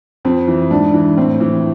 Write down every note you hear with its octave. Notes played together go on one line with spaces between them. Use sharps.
F2 C4
E3
G#2 D4
E3
A2 C4
E3